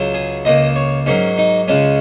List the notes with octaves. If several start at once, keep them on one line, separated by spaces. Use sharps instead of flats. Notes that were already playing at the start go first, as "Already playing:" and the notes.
Already playing: C#2 C#3 F#3
G#4
C#2 C#3 A#3 D#5
C#5
G#2 F#3 A#3 C#4
D#4
C#2 C#3 G#3 C#4